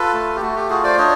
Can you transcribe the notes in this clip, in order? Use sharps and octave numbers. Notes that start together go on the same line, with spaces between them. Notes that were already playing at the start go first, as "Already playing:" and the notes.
Already playing: F4 A4 B4
A3
G4
A3 F#4
G4
F4 F#4 G#4
C5 D5
D4 C#5 D#5